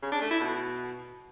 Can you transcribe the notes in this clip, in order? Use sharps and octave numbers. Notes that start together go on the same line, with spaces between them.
C#3
D4
A3
E4
B2